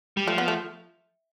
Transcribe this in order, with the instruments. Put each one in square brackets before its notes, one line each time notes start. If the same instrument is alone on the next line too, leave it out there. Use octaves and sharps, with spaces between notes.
[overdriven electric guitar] G3
[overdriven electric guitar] F3 [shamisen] A3
[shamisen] B3
A3